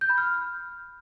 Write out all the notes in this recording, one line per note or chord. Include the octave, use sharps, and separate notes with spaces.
G6
B5
F6